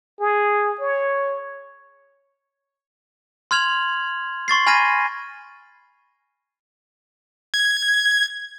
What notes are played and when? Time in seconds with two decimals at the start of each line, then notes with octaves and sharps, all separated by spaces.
0.20 G#4
0.81 C#5
3.51 C6 F6 G#6 F7 F#7
4.48 C6 C#6 A6 C7
4.67 G#5 B5 F6 G#6 A#6 D#7
7.54 G#6